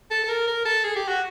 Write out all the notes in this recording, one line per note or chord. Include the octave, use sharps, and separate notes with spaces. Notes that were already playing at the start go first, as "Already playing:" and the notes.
A4
A4
A#4
A#4
A4
G#4
G4
F#4